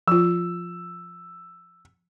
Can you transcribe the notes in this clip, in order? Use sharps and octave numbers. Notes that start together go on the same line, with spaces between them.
F3 F4 E6